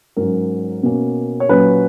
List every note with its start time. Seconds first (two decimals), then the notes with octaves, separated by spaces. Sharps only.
0.17 G#2 F#3 C#4 A#4
0.83 B2 A#3 C#4
1.40 C#5
1.49 A#2 F#3 C#4 B4